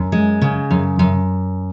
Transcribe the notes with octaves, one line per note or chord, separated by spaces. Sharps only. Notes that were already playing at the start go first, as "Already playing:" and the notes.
Already playing: F#2
G#3
C#3
F#2
F#2